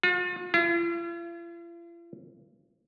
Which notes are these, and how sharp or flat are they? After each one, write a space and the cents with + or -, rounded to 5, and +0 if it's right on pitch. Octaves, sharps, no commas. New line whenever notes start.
F4 +45
F4 -45